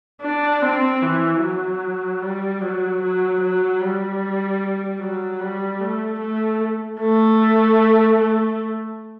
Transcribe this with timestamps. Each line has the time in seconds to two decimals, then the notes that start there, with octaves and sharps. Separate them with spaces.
0.21 D4
0.62 C4
1.02 E3
1.41 F#3
2.21 G3
2.61 F#3
3.01 F#3
3.41 F#3
3.80 G3
5.00 F#3
5.40 G3
5.80 A3
6.20 A3
7.00 A3
8.19 A3